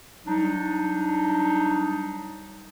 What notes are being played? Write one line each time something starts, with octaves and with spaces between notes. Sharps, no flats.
F#3 G3 D4 D#4